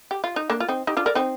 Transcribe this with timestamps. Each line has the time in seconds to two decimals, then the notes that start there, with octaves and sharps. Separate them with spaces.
0.11 G4
0.24 F4
0.36 D#4
0.50 A#3 D4
0.60 F4
0.69 C4 D#4
0.87 D#4 G4
0.97 D4 F4
1.06 A#4 D5
1.15 C4 D#4